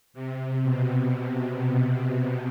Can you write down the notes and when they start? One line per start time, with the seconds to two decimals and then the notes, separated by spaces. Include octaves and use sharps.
0.14 C3
0.63 B2